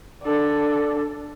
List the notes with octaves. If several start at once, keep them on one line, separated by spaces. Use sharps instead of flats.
D4 A4